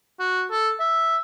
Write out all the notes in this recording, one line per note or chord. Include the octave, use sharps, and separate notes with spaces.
F#4
A4
E5